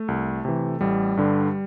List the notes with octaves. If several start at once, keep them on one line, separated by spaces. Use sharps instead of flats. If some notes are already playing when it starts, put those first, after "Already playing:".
Already playing: A3
C2
C3 E3
A1 G3
G2 D3